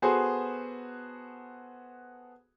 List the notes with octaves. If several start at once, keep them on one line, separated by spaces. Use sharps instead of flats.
B3 F#4 G#4 A4 C5